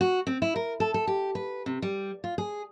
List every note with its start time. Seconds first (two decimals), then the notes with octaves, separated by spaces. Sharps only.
0.01 F#4
0.27 C4
0.42 E4
0.56 A#4
0.80 A4
0.94 A4
1.07 G4
1.35 B4
1.66 C3
1.82 G3
2.24 F4
2.38 G#4